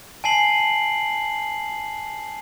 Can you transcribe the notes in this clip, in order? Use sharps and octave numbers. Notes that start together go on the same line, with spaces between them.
G#5 A5 C7 F#7